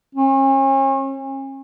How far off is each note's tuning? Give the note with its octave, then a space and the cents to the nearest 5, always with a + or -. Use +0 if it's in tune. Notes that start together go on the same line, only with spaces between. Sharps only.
C#4 -40